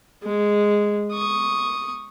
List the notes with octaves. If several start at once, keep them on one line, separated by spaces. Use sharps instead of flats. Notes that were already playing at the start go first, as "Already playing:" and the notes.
G#3
C#6 D#6